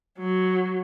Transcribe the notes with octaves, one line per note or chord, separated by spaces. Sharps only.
F#3